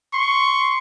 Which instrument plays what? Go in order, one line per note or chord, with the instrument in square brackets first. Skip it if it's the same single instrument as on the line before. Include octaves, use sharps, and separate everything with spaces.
[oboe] C6 [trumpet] C#6